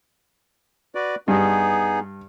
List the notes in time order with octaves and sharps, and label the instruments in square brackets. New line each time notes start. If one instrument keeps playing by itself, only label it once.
[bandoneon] F#4 B4 D5
[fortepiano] G2 [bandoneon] B3 D#4 G#4